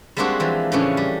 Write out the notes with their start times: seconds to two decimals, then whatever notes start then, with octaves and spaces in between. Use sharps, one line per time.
0.17 G3 G#3 A#3 C4 D4 F#4
0.40 E3 F3
0.72 A2 C#3 E3 F3 C#4 D4
0.97 G3